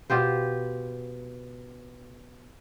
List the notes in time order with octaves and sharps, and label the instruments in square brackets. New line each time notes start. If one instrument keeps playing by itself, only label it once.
[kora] B2 F4 G4 C5